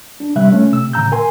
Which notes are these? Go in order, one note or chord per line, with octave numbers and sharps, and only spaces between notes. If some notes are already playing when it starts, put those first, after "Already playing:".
D4
C3 G3 E5 F#6
A3 C#4
C3 E6
A2 C#3 A#5 E6 G6
A#4 G#5 C6